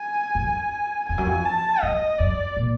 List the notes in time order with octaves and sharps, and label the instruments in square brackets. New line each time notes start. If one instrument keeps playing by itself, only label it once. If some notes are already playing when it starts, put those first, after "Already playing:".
Already playing: [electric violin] G#5
[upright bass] F#2
[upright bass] F2 [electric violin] G#5
[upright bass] F#2
F2
[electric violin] A5
[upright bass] F#2 [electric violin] D#5
[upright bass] F#2 [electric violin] D5
[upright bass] A#2